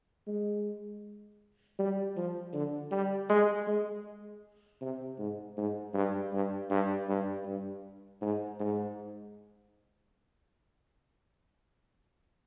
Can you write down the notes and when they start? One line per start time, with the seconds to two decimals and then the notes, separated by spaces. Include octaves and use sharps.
0.27 G#3
1.79 G3
2.16 F3
2.53 D3
2.91 G3
3.29 G#3
3.67 G#3
4.81 C3
5.19 G#2
5.57 G#2
5.94 G2
6.33 G2
6.70 G2
7.09 G2
7.46 G2
8.22 G#2
8.60 G#2